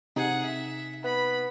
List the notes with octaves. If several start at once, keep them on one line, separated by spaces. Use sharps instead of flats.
C3 D#4 G#4 F#5
E5
B3 B5